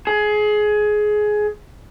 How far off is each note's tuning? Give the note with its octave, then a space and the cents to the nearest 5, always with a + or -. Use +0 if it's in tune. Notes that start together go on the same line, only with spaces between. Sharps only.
G#4 +20